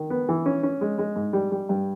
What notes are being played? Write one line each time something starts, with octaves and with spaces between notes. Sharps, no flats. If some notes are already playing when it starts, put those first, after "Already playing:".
Already playing: D#3
B3
E3
C#4
C#4
G#3
G#3
G#2
G3
G3
G2